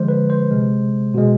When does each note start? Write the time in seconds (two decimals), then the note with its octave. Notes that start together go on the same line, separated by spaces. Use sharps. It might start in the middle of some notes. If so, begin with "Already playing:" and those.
Already playing: D3 F3 G#3 C5
0.08 B4
0.30 C5
0.51 C3 G#3
1.14 B2 G#3